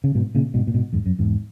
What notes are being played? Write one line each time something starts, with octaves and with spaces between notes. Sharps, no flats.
C#3
G#2 B2
A#2 C#3
G#2 B2
A#2
G#2 B2
E2 G#2
F#2
E2 G#2